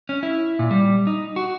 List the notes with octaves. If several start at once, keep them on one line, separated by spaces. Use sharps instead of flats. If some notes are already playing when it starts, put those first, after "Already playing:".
C#4
E4
A#2
G3
D#4
F#4